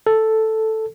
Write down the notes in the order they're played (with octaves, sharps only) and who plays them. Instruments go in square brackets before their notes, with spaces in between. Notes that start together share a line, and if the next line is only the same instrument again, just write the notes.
[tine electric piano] A4